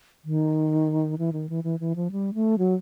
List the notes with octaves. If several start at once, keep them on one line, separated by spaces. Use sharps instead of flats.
D#3
E3
D#3
E3
E3
E3
F3
G3
A3
F#3